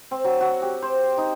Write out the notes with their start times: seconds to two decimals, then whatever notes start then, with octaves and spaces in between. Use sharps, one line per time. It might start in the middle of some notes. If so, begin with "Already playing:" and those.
0.11 C4
0.24 F#3
0.41 F#4
0.62 G4
0.82 C5
1.18 D#4